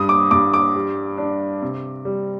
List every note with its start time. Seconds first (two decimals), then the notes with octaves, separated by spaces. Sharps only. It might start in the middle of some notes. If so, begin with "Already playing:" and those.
Already playing: G2 D#6
0.09 D6
0.31 G2 D6
0.54 D6
0.76 G3
1.18 D4
1.62 C3
2.05 G3